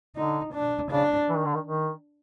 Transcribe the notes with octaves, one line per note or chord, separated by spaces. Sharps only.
D3 D#4
D4
C#3 D4
E3
D#3
D3
D#3
D#3